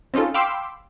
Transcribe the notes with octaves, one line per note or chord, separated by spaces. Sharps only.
C4 C#4 D#4 F4 A4
F5 G5 B5 C6 D6 E6